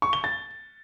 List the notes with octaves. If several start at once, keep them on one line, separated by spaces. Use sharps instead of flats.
C#6
G7
A6